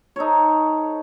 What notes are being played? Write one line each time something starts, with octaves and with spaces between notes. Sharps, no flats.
D#4 A4 C5 C#5